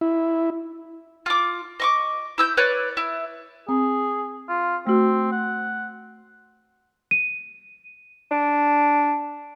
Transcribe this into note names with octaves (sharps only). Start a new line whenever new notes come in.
E4
F4 D6
D#5 C#6 D6
E4 E6 G6
B4 C#5 D5
E4
C4 G#4
F4
A3 C4 F#4
F#5
D#7
D4